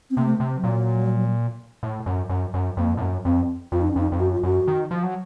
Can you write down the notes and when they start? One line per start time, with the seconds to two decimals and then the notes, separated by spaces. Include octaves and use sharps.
0.11 C4
0.17 C3 A#3
0.24 A3
0.40 C3
0.56 F#3
0.64 A#2
1.83 A2
2.06 F#2
2.30 F#2
2.54 F#2
2.77 F2 A#3
2.97 A2
3.01 F#2
3.25 F2 C4
3.72 F2 F4
3.82 D#4
3.91 C#4
3.96 F2 D#4
4.12 F2
4.20 F#2 F#4
4.32 F4
4.43 F#2 F#4
4.68 D#3
4.91 F3
5.03 F#3